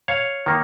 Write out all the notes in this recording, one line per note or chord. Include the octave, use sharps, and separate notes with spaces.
C#5 F5
D#3 A#3